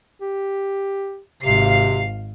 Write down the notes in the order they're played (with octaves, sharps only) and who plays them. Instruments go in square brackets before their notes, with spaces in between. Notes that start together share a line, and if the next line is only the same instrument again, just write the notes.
[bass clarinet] G4
[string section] G#1 F5 C7 [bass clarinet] C3